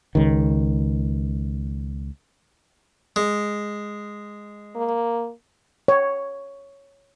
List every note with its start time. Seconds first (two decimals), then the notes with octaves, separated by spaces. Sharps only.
0.15 C#2 D#3
3.16 G#3
4.76 A#3
5.88 C#5